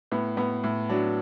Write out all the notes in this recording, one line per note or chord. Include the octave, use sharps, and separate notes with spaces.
A2 B3
A2 B3
A2
F#3 D4